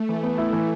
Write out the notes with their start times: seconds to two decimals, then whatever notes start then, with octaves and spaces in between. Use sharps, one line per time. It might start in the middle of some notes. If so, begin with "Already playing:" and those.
Already playing: A3
0.09 E3
0.23 B3
0.38 E4
0.53 E3